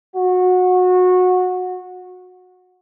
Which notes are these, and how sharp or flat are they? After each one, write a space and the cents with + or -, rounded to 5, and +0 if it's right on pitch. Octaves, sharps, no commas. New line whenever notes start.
F#4 -20